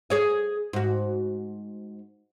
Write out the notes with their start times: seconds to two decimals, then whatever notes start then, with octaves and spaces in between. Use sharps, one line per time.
0.10 G#4 C#5 D#5
0.73 G#2 F#4